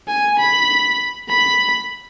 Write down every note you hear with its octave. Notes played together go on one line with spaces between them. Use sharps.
G#5
B5
B5